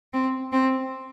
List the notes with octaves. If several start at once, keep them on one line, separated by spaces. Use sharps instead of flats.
C4
C4